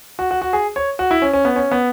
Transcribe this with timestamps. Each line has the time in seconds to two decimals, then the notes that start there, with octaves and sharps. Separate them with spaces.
0.19 F#4
0.31 F#4
0.42 F#4
0.53 G#4
0.76 C#5
0.99 F#4
1.11 E4
1.22 C#4
1.33 C#4
1.45 B3
1.56 C#4
1.72 B3